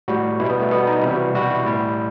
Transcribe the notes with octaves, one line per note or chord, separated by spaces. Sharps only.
A2 G3 F#4
B2 G3 E4
B3
A3
B2 G3 B3
D#4
C3 E3 G3 E4
F#4
B2 G3 F#4
E4
A2 G3